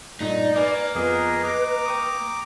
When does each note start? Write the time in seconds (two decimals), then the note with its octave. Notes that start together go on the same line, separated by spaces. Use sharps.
0.20 G2 A#2 A3 D#4 D5
0.56 A#3 B4 G#5 D6
0.95 F2 B3 F4 G#4 A#4 B4 D#5
1.44 D#5 A#5 D6
1.86 G5 C#6 D#6